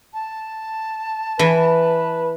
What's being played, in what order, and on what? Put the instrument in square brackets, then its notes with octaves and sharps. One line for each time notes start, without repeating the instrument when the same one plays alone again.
[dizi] A5
[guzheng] E3 [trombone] B4